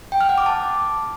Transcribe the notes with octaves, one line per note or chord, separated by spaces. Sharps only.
G5
F6
F#5
D6
A5